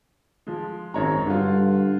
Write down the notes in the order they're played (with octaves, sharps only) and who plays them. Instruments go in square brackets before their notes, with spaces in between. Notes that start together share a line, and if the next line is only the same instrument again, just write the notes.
[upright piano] F3 G#3
[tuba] G#1 [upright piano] F#2 C#5 A#5
[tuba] G2 [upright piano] D3 F4